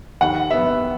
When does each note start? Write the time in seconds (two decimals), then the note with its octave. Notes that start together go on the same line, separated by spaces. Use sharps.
0.21 D#2 F#5
0.50 B3 E5